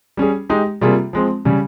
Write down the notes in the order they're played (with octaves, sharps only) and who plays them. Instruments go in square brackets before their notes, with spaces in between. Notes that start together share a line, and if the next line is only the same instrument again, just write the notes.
[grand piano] G3 C#4 G#4
G#3 D#4 G4
C3 G3 A#3 F4 G#4
F3 G#3 C4
C#3 G3 C#4